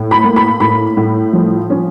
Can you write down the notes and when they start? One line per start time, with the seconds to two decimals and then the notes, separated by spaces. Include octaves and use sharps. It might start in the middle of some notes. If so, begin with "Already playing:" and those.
Already playing: A2
0.11 B5
0.24 A#3
0.36 B5
0.60 A2 B5
0.97 A2
1.33 F3
1.70 C#4